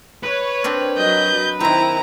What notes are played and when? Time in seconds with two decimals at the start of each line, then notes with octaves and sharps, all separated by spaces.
0.24 B4 C#5
0.64 C4 D4 A#4
0.97 F#3 D#5 G6
1.60 D#3 C4 E4 A#5